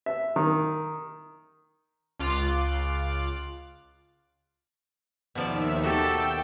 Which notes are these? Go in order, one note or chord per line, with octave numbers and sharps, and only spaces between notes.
E5
D#3
C#2 F4 D6 F#6 A6
D#2 B2 D#3 F3 D5 E5
F#4 G4 A4 G5 A5